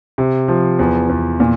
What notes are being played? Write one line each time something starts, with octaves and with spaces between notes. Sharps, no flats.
C3
F3
E2
E2
A#2